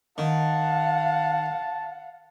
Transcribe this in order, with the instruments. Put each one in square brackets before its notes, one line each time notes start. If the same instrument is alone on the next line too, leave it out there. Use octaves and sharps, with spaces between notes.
[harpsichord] D#3 [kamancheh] F5 F#5 [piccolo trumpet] A5